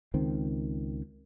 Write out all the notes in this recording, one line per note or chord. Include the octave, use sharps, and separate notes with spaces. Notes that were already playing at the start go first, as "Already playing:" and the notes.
C#2 D#3 C4